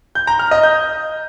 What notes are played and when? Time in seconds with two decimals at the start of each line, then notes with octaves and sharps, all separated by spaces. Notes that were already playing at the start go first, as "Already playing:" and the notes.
0.15 G6
0.27 A#5
0.39 F6
0.51 D#5
0.63 G6